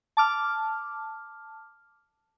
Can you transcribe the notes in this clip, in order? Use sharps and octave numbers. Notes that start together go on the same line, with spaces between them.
A5 D6 F6